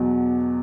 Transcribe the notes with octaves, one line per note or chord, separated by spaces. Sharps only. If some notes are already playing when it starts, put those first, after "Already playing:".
Already playing: E2 B2 F#3